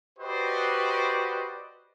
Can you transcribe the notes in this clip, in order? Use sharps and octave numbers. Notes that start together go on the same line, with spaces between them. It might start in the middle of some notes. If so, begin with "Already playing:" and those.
F#4 G4 B4 C5 D5 D#5